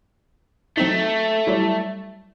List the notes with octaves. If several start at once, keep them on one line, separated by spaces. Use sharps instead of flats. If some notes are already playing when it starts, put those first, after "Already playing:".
F#3 A3 C4 D#4
F#3 G3 E4